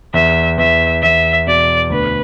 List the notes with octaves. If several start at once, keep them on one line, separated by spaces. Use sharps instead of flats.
E2 E5
E2 E5
E2 E5
B2 D5
D2 B4